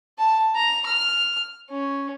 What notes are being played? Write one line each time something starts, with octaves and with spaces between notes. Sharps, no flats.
A5
A#5
F6
C#4